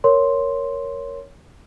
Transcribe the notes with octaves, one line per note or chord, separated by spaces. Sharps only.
A#4 C#5 C6